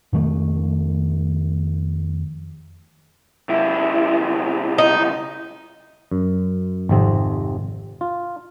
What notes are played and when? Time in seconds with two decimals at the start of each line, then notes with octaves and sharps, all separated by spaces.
0.13 F2 D#3 G#3 A3
3.49 C#2 E4
4.78 D#4
6.12 F#2
6.89 G#1 F2 C3 C4
8.01 F4